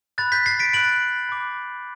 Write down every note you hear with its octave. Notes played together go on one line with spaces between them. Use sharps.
B5 F#6 A6
G6 B6
A6 C7
B6 D7
B5 F#6 D7 F#7
B5 D6 F#6